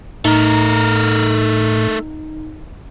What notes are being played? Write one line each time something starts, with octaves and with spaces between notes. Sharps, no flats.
A2 A3 D#4 A#4